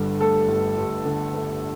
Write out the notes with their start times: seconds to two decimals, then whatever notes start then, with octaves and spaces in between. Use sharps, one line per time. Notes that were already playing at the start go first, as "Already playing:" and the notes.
Already playing: G1 G2 D3
0.20 A3 A4
0.48 G1
0.78 G2
1.05 D3
1.34 A3